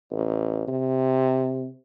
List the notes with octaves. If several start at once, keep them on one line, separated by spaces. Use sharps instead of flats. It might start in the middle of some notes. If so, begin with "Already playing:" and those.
A1
C3